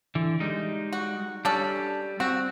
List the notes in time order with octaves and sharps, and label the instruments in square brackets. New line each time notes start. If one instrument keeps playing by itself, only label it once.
[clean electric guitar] D3 E3
G3 G#3 D#4
[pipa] F#4
[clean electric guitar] G3 [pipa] C#4 D4 A4
[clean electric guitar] C4 [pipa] F#4